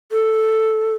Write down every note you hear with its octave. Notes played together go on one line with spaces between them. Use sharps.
A4